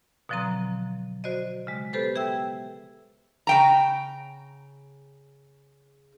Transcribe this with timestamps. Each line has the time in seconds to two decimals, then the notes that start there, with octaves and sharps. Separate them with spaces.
0.29 B2 D3 F3 F#3 C4 A#5
1.24 F#4 C5 D5 D#5
1.67 C#3 G#3
1.93 B3 G4 A4 B4 C5
2.16 G#4 E5 G5 E6
3.47 C#3 G5 A#5